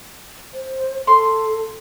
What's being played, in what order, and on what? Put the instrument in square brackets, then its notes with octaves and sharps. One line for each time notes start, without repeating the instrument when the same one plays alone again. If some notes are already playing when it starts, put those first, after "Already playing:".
[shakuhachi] C5
[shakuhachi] A4 [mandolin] C6